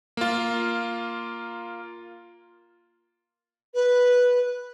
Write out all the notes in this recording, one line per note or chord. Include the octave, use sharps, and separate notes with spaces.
A#3 F4
B4